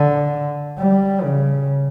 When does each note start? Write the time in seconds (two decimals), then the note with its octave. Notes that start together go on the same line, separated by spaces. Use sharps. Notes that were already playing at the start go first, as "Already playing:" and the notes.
Already playing: D3
0.79 G3
1.21 C#3